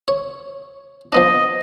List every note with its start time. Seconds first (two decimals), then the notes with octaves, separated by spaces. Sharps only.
0.08 C#5
1.12 F3 B3 D4 D#5